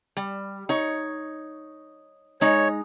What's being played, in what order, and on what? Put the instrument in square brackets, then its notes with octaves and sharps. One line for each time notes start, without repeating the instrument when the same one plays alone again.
[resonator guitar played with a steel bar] G3
D#4 C#5
[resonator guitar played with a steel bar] G#3 D#4 [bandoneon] C#5